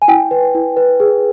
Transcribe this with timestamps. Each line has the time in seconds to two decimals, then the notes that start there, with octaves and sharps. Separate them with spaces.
0.02 G#5
0.08 E4 G5
0.31 B4
0.55 E4
0.77 B4
1.00 G#4